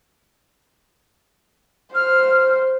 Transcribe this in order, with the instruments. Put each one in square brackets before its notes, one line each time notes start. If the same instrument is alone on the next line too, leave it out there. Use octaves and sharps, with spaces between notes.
[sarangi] C5 [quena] F6